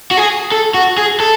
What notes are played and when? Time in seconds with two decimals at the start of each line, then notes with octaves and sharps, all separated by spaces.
0.11 F#4
0.17 G#4
0.52 A4
0.74 F#4
0.98 G#4
1.20 A4